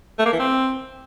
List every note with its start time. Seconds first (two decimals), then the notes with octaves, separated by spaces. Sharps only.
0.19 A3
0.26 A#3
0.33 E3
0.40 C4